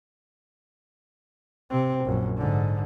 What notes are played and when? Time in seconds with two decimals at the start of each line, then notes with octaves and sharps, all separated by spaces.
1.71 C3 C4
2.05 A#1 F#2
2.38 G#2 D3